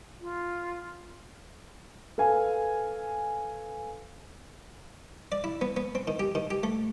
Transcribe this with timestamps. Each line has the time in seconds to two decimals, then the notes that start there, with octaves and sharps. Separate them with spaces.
0.21 F4
2.18 A4 B4 F5 G#5
5.32 D5
5.44 E4
5.61 B3
5.77 B3
5.95 C4
6.08 D#3
6.19 G4
6.35 D#3
6.51 G4
6.63 A3